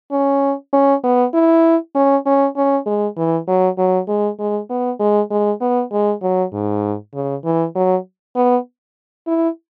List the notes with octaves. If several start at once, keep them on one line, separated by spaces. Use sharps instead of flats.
C#4
C#4
B3
E4
C#4
C#4
C#4
G#3
E3
F#3
F#3
G#3
G#3
B3
G#3
G#3
B3
G#3
F#3
G#2
C#3
E3
F#3
B3
E4